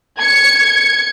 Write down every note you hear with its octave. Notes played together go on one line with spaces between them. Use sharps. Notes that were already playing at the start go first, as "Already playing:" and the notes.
G#6 C#7